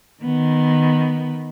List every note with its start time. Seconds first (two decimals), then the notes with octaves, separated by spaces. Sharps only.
0.24 D#3 B3